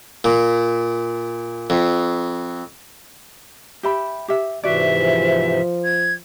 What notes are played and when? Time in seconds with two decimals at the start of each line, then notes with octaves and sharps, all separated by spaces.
0.24 A#2
1.70 F2
3.83 G4 E5 B5
4.28 G4 E5
4.64 G#2 C3 E3 F#4 D5 E5
4.98 F3
5.84 G#6